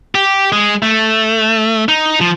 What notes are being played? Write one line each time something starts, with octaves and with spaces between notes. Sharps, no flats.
G4
G#3
A3
D#4
F3